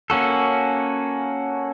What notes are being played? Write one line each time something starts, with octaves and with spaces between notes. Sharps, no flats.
A#3 C#4 F#4 A4